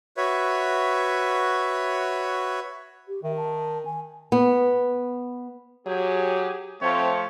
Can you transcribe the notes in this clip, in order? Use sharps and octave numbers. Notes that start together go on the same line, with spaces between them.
F#4 B4 C#5 E5
G4
D#3 E5
A5
G#5
B3
F#3 G4 G#4
F3 A3 C4 C#5